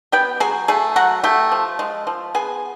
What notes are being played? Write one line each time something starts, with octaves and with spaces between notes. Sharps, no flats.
B3 G4 G5
F#3 G#4 G#5
A3 G#4 G#5
F#3 F#4 F#5
A3 G4 G5
F3
G#3
F3
B3 G#4 G#5